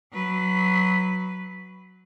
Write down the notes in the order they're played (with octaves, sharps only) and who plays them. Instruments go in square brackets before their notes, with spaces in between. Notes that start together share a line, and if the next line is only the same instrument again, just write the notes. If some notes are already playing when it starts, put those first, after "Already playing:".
[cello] F#3 B4